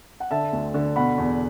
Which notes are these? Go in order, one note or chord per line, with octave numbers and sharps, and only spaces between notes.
F#5
D3 E5 A5
D2
D3
B2 F#5 B5
E2